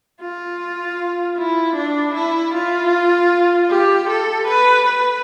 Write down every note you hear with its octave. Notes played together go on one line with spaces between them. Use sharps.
F4
E4
D4
E4
F4
G4
A4
B4
B4